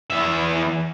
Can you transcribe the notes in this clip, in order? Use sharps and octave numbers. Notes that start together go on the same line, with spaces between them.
E2 E5